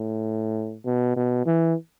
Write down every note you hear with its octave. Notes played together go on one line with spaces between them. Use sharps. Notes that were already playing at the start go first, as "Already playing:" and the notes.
Already playing: A2
B2
B2
E3